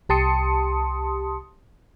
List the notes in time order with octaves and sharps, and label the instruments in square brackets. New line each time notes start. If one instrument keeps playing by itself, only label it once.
[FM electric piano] C2 G4 A5 C6 D#6 C#7